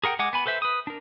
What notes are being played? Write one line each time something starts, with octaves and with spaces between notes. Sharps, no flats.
G#4 A#4 F#5 G5
G#3 F#5 G#5 D6
B3 G#5 B5
A4 B4 C5 E5
B4 D#6
D4 A#4